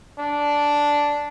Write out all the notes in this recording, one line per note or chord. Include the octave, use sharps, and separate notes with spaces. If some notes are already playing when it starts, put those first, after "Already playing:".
D4